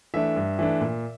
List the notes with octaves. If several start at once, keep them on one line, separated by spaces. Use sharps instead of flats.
E3 A3 D4 E5
G2
E3 A3 D4
A#2